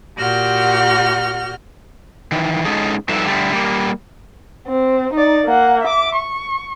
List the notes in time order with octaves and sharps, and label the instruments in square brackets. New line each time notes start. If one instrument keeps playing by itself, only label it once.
[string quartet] A#2 F#4 G4 F6 G6
[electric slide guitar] D#3 E3
G#3 C#4 D#4 G#4 A4
F3 G3 D#4 A4 B4 E5
D3 G3 A3
G3 A#3
[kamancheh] C4
D#4 D5
A#3 F#5
E5 D6
C#6